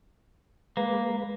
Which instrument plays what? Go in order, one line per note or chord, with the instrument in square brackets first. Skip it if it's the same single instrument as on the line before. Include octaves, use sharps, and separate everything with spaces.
[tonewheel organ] G#3 B4 [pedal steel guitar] A#3